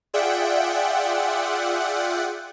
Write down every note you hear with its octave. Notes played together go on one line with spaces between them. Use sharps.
F4 G#4 D5 E5 F#5 G5